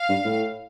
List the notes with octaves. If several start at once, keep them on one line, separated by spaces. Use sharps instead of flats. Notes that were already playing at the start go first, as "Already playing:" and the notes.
Already playing: F5
G2
A2